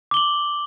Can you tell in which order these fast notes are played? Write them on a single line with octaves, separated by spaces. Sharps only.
D6 G7 F#7